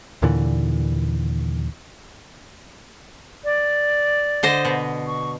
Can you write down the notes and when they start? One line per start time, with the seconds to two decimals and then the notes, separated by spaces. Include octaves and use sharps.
0.22 D#2 A#2 D3 E3
3.44 D5
4.43 D3 C5 D#5
4.65 B2
5.07 C#6